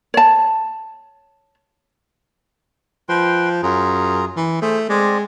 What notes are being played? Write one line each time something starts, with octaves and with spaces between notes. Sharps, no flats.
C#5 A5
F3 B4 G5 C6
F#2 F4 G#4 A#5
E3
A3 G#4 C5
G#3 C4 D5 D#5